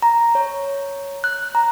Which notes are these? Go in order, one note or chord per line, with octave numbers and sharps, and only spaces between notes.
A#5
C#5
F#6
A#5